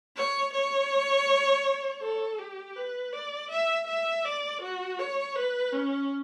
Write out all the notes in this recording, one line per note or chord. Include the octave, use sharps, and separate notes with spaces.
C#5
C#5
A4
G4
B4
D5
E5
E5
D5
F#4
C#5
B4
C#4